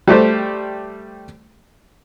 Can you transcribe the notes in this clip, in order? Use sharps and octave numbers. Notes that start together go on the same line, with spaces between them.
G3 A3 G4 C5